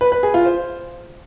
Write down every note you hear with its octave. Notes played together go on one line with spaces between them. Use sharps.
B4
B4
G#4
F4
C5